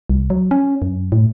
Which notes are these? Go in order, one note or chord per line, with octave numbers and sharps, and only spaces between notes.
C2
F#3
C#4
F#2
A2